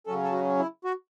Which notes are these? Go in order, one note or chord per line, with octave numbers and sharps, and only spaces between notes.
C#3 F#3 C#4 A4
A4
F#4
E4
F#4